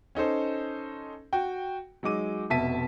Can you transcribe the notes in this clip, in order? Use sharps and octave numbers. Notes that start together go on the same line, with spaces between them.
C#4 D#4 A4 C5
F#4 G5
F#3 G#3 D#4 D6 D#7
F1 B2 E5 A5 B6 D#7